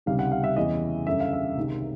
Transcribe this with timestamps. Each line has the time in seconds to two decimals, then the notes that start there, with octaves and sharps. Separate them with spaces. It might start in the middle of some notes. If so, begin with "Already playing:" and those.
0.06 C#2 C3 D#3 G3 F5
0.19 F#5
0.32 F5
0.44 E5
0.56 E2 C#3 E3 D#5
1.06 F#2 D3 G3 E5
1.20 F5
1.33 E5
1.57 C2 C3 D#3 G#3